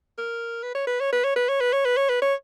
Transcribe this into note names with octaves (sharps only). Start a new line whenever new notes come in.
A#4
B4
C#5
B4
C#5
B4
C#5
B4
C#5
B4
C#5
B4
C#5
B4
C#5